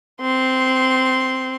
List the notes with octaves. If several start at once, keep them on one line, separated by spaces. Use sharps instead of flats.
C4 C6